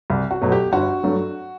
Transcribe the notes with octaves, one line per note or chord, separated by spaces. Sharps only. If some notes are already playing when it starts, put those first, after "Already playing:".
C2
F#4
B2 F#3 A3
G4
G1 F#4
G2 F#3 A3